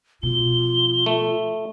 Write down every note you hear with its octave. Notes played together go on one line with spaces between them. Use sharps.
B2 F3 F4 G7
A3